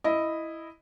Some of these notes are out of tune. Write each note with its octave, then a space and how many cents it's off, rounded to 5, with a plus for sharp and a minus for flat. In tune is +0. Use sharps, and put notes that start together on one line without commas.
E4 +0 D#5 +0